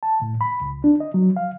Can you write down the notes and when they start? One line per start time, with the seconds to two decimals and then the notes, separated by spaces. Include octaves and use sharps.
0.03 A5
0.22 A2
0.41 B5
0.61 C#2
0.84 D4
1.00 D#5
1.14 F#3
1.36 F5